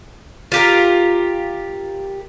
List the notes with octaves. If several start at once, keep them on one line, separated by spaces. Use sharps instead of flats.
F4 G4 A#4